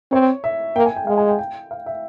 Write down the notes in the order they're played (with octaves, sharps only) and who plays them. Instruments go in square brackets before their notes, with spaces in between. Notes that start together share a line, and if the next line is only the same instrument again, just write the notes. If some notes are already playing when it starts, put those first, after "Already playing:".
[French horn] C4 [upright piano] C#5
[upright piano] E5
[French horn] A#3 [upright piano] G5
[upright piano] G#5
G5
[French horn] G#3 [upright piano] F5
[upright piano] G#5
G5
G5
F5
E5